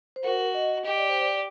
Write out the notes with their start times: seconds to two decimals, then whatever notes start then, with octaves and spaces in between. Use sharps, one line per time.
0.16 C5
0.24 F#4 A#4
0.54 D#5
0.84 G4 D#5
0.97 D5
1.09 C5
1.22 D5